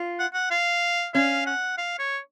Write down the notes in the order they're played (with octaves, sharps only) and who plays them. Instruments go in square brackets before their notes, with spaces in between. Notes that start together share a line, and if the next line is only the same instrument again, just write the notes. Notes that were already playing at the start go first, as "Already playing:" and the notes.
Already playing: [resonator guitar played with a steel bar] F4
[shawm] F#5
F#5
F5
[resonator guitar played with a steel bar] C#4 [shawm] F5
[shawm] F#5
F5
C#5